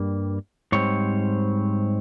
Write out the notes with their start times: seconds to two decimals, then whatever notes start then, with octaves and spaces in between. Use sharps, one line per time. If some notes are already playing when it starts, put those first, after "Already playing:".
Already playing: G2 G3 A#3
0.72 G#2 G3 C4 C#5